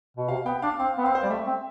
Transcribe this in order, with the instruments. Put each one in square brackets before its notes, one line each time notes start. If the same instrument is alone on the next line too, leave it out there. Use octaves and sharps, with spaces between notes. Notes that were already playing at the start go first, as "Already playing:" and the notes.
[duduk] B2
[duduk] C3 [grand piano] F5
[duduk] B3 [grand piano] G5
[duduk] D4 [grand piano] F5
[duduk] C4 [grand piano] F5
[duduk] B3
[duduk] C4 [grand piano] F5
[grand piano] C5
[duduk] G3 [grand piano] D5
[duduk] A3 [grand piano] E5
[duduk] C4